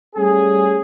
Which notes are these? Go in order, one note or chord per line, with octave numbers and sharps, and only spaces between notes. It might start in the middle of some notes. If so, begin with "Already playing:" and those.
G3 A3 C#4 G#4